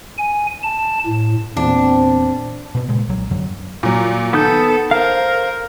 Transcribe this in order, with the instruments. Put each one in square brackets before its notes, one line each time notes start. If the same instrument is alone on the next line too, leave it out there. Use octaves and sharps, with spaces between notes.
[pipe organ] G#5
A5
A2
[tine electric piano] E2 A#2 [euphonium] C4 [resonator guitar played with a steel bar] D4
[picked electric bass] B2 B3
A#2 C#3 G#3
C2 F#3
F#2 D3 F#3
[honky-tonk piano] A#2 F#3
[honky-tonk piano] D#3 [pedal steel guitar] B3 D#6 G6 [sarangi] A4
[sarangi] A#4 [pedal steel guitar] C5 F5 [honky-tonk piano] F6